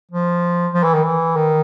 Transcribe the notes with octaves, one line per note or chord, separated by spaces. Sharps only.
F3
F3
E3
D#3
E3
D#3